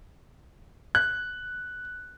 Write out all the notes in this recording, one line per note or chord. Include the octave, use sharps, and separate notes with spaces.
F#6